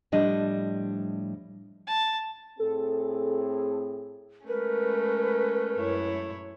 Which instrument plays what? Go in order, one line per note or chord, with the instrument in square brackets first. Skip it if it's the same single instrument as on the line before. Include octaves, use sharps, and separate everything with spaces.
[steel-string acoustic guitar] A2 F3 G3 D4 D#5
[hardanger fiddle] A5
[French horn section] A2 C4 G#4 [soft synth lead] A4
[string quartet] G#3 A3 C#4 [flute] A#4 [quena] B4
[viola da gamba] F#2 E4 C#5